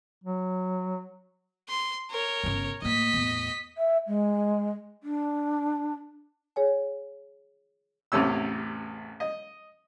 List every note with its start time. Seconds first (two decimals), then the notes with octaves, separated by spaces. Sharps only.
0.24 F#3
1.69 C6
2.10 A#4 C#5
2.43 G1 C#3
2.82 A2 A#3 D#5 B6
3.14 E2 A2
3.78 E5
4.08 G#3
5.03 D4
6.56 G#4 C#5 G#5
8.12 A1 E2 C3 A3 C#4 E6
9.20 D#5